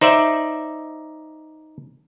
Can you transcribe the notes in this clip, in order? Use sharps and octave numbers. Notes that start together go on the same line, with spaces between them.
D#4 C5 D5 E5